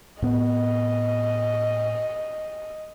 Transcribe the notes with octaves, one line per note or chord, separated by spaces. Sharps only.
A2 B3 D#5